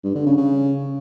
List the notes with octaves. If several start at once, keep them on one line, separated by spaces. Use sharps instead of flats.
G2
D3
C#3
C#3